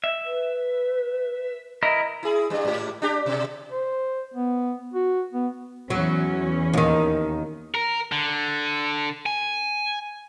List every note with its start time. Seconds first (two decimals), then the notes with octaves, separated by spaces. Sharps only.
0.04 E5
0.25 B4
1.83 E4 A#4 D#5
2.23 E4 G#4
2.50 G2 G3
2.65 G#2 G4
3.02 D4 G4
3.26 B2
3.72 C5
4.34 B3
4.94 F#4
5.33 B3
5.90 E2 F#3 C#4
6.73 D#2 D#3
7.75 A#4
8.12 D3
9.26 G#5